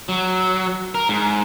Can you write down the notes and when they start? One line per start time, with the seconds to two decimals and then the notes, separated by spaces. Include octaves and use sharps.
0.09 F#3
0.95 A#4
1.09 G#2